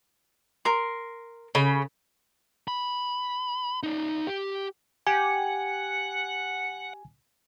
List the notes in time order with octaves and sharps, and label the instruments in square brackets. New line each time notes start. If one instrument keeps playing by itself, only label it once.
[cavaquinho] A#4 C6
[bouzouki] C#3 [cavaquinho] B5
[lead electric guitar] B5
D#4 D5
G4
[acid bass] G4 [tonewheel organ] F#5 [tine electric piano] G#5